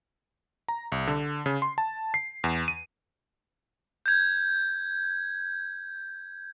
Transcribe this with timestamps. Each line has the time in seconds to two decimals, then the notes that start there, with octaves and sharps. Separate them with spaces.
0.68 A#5
0.92 C2
1.07 D3
1.46 C#3
1.62 C6
1.78 A5
2.14 C7
2.44 E2
2.68 D#7
4.06 G6 G#6